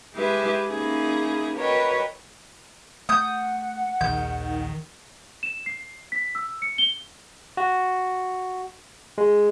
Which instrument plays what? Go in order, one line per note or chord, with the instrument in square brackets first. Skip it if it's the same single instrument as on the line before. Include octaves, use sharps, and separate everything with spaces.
[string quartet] G#3 E4 G4 B4 E5 G#5
A#3 C#4 D#4 E4 G#4
F#4 A#4 B4 C#5 D#5 G5
[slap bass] A3 [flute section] F#5 [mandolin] D#6 G6
[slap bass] A#1 D#2 [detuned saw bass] D#3 [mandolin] G6
[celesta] E7
C7
B6
E6
C#7
G7
[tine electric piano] F#4
G#3